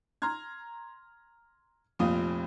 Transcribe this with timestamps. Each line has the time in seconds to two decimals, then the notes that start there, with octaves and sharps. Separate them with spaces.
0.22 A#5 C6 F6 G#6
1.99 F1 F2 A#2 F5 D#6